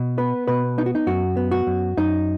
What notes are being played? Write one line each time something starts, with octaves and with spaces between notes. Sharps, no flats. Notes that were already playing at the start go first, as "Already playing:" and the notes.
Already playing: B2
B3 B4
B2 B4
B3 D#4
F#4
D#4
F#2 F#4
B3
F#4
F#2
F#2 D#4